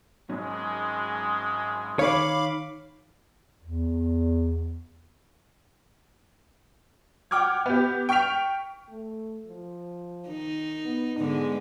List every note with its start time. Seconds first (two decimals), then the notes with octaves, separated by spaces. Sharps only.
0.30 G#1 G#2 F#3 G#3 C#4
1.99 D#3 C#5 F5 B5 D6
3.62 E2
7.31 F#5 G5 D6 F6 G#6
7.66 B3 G4
8.09 G5 C#6 F6 B6 F7
8.89 A3
9.46 F3
10.28 D#3 D#4
10.84 B3
11.17 G#2 D3 G#3 B3